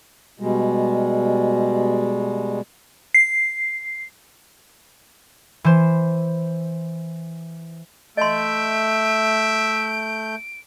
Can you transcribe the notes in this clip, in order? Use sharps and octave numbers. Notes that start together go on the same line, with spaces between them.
B2 G3 G#3
C7
E3 C5
A3 D#5 E5 C6 G6 D7